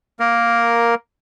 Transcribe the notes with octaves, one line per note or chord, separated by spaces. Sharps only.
A#3 A#4